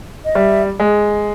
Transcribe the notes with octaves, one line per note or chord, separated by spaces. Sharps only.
D#5
G3 E5
G#3